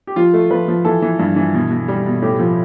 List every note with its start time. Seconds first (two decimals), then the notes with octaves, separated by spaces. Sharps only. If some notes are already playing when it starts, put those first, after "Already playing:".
0.07 G4
0.16 F3 F4
0.33 A3
0.51 F3 B4
0.68 F3
0.85 E3 A4
1.02 E3
1.19 G2
1.36 E3
1.54 B2
1.71 B2
1.88 G3
2.06 B2
2.22 A2 G4
2.40 F3